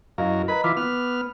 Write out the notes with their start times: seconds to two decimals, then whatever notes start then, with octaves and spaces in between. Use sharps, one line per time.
0.18 F#2 E4 A#4 D#5 F5
0.48 A#4 B4 D#5 A#5 B5
0.64 E3 F4 D6 B6
0.77 B3 F6